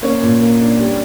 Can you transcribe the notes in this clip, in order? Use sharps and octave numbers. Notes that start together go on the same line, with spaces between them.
A#3 C#4 C#5
A#2
A#3
D4
G3